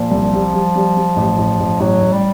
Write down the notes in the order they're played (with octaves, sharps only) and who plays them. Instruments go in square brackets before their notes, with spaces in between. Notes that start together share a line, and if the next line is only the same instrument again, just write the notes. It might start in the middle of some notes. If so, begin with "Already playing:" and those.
Already playing: [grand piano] A#2 [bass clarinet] F3
[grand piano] C2
G3
G3
G3
G3
A1
A1
A1
[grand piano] A1 [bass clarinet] F#3
[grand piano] A1
[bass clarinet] G3